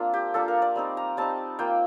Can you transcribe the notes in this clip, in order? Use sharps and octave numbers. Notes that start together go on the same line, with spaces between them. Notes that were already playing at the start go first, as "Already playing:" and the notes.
Already playing: A#3 C4 D4 F4
G4
A#3 D4 F4 A4
A#4
D5
G3 C4 D#4
A#5
G3 C4 D#4 A5
A#3 F4 G5